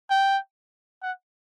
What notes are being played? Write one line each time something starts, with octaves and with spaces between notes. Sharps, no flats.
G5
F#5